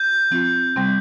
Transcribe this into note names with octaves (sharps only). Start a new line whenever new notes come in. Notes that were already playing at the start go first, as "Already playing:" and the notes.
Already playing: G6
F3 C4 F4
C3 G3 C4